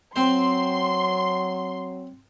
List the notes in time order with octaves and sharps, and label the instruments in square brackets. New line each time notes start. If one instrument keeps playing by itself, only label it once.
[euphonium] F#3 [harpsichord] C4 C5 [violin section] C6